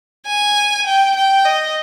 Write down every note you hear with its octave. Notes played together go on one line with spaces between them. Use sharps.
G#5
G5
G5
D#5